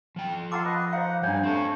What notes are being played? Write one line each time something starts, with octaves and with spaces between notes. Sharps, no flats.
F3 G5
F4 A4 F#5 A#5 D6
B4 D#5
D#4 C5 F5 F#5
G2 D4 C#5 G#5
A3 C4 A4